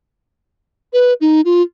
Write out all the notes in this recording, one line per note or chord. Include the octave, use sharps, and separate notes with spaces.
B4
D#4
F4